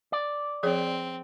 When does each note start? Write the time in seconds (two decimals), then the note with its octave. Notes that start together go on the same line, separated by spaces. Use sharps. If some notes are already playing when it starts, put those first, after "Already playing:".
0.12 D5
0.63 F3 C4 G#4 C#5